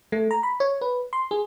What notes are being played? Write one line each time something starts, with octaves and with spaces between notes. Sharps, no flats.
A3
A#5
B5
C#5
B4
C6
G#4